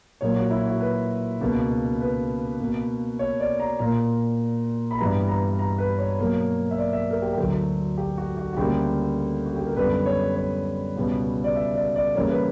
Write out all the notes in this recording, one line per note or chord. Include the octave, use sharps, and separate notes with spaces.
A#2 F#3 A#3 C#5
F#4
E4
F#4
B4
C#2 B2 A#3
B4
B2 A#3
C#5
D5
A#5
A#2 A#3 A#5
B5
G2 E3 G3 B3 A#5
A#5
A#5
B4
C#5
B2 F#3 A#3
E5
D5
E5
A#4
G4
G4
D2 D3 F#3 A#4
G4
F#4
F#4
F#4
D2 C#3 G3 A#3 G4
F#4
G4
A#4
F#2 D3 G3 B3 B4
C#5
C#5
C#2 B2 G3 B3
D5
E5
D5
D5
E2 C#3 G3 A#3 C#5
B4